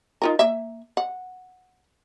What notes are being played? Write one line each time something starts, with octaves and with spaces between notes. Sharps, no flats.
D#4 F4 A#4
A#3 E5
F#5